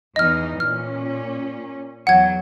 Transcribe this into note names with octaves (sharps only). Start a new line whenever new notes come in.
E2 E3 D#4 D#5 F6
A#2 C#4 F6
E2 F#3 F#5 G#6